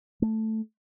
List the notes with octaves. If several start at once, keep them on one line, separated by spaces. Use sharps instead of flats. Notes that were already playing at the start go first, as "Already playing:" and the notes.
A3